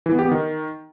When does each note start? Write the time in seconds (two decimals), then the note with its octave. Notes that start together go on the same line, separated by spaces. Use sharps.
0.06 E3
0.12 B3
0.19 G4
0.25 B3
0.31 D#3